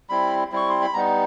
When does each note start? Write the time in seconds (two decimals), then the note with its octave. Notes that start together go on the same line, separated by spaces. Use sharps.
0.09 G3 C4 E4 B5
0.52 G3 C4 E4 C#6
0.69 C6
0.82 B5
0.94 G3 B3 D#4 A#5